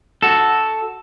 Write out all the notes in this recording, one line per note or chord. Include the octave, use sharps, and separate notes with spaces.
F#4 A4